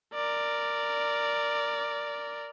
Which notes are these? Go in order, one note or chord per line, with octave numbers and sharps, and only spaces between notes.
A#4 D5